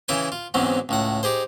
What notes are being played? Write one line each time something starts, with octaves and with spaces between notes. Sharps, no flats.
C#3 E3 E4 C#5 G5 G#5
F4
E2 G#2 F#3 C4 C#4
C#2 A2 F#5
D#4 G4 G#4 C5